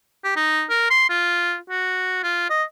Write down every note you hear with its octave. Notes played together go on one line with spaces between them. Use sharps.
G4
D#4
A#4
C6
F4
F#4
F4
D#5